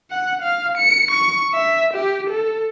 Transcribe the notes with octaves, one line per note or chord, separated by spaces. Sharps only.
F#5
F5
C#7
C#6
E5
G4
A4